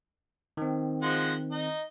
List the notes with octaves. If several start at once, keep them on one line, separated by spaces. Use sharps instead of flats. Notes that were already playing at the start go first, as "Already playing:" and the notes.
D#3 C4
F3 G#3 F#5
D#4 D#5